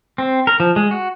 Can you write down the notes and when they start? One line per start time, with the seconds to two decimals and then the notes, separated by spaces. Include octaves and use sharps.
0.18 C4
0.47 A#4
0.60 F3
0.76 G#3
0.91 F#4